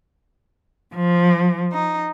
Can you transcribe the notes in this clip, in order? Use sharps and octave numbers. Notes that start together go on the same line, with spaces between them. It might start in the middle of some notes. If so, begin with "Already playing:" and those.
F3
D#4